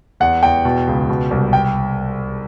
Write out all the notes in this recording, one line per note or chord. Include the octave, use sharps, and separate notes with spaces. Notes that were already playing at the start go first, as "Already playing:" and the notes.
E2 F#5
E2 G5
B2
C#2
B2
C2
G5